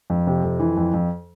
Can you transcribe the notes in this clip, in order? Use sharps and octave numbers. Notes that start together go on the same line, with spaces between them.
F2
C3
F2
E3
F2
F2